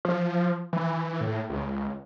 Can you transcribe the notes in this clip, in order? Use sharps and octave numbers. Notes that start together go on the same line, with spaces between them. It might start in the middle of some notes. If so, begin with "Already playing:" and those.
F3
E3
A2
C#2